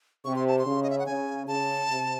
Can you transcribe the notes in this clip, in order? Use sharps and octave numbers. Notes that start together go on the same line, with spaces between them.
C3 C#6
C6
A5
C6
C#3
D#5
E5
F#5
C#3 G#5
C#3 A5
C3